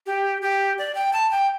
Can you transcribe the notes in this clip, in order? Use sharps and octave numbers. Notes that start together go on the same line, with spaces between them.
G4
G4
D5
G5
A5
G5